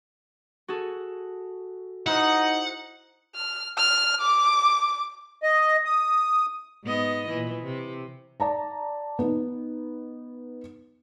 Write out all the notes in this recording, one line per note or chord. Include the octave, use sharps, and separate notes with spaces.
F#4 G#4 A4
D#4 E4 C5 F#5
F6
F6
D6
D#5
D#6
G#2 B3 D#5
A#2 E3
C3
D5 A5 A#5
B3 D#4